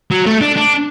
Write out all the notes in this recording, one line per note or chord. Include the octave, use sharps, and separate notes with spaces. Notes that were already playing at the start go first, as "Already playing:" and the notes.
F#3
A3
D4
D4